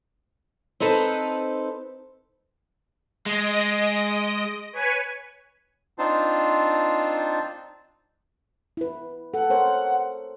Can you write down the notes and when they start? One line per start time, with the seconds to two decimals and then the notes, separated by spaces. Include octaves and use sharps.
0.80 C4 D#4 A4 B4 C5
3.26 G#3 D#5 A#6 D7
4.73 B4 C#5 G#5
5.98 C4 D4 D#4 F4 C5 A5
8.77 E4 B4
9.34 A4 F#5
9.50 A#4 C5 C#5